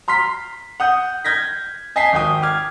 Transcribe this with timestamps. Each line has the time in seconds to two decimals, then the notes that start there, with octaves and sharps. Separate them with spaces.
0.08 A#5 C6 F6 B6 C7
0.80 F#5 D#6 G6
1.25 G6 G#6 A#6 B6
1.96 D#5 G#5 A5 B6 C7
2.13 G#1 G5 D#6
2.42 D6 F6 G#6